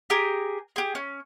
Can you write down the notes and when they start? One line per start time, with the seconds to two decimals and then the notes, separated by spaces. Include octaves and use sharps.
0.10 G4 G#4 A#4
0.76 G4 G#4
0.95 C#4